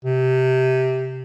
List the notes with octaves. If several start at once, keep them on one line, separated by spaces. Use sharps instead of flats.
C3